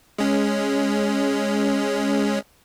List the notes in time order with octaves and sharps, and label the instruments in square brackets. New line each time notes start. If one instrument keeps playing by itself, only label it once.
[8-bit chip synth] G#3 C#4